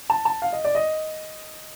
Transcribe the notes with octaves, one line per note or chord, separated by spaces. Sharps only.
A5
A5
F5
D#5
D5
D#5